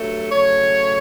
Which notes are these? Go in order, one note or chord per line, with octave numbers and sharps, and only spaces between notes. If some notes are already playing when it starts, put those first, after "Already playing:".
Already playing: G2 F#3 A3
C#3 F#3 A3 C#5